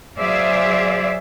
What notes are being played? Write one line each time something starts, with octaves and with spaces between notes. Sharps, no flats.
F#3 G#4 C5 D5 E5 F5